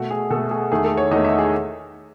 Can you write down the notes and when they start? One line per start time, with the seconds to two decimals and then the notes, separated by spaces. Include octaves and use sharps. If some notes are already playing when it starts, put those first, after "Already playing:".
Already playing: B2 A3 F#4
0.10 G#4
0.30 B2 A3 A4
0.51 G#4
0.72 E2 D#3 A3 G#4
0.84 A4
0.97 C#5
1.11 E2 D#3 A3 D#5
1.25 E5
1.39 G#4